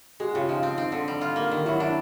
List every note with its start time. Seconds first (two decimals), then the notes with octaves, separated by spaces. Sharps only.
0.20 G#3 F#4 G#4
0.34 C#3 F4 G4
0.49 F3 D#4 F4
0.63 C4
0.78 C4 D#4
0.92 D3
1.08 G3
1.21 F4
1.36 A#3
1.51 D#3
1.65 F#3 E4
1.80 D4 E4